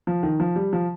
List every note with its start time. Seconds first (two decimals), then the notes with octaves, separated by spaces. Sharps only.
0.07 F3
0.23 D#3
0.40 F3
0.56 G3
0.73 F3